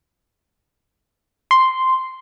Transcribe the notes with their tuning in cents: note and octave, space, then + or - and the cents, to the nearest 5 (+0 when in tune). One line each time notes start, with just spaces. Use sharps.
C6 -5